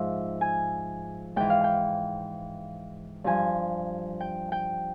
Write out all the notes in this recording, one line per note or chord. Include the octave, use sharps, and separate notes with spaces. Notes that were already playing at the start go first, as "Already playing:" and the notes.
Already playing: G#2 F3 E5
G#5
G#2 E3 G5
F5
G5
G2 F3 G#5
G5
G5